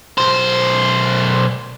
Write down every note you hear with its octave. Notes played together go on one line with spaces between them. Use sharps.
B1 C5